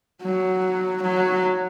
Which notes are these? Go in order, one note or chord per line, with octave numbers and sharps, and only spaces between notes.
F#3
F#3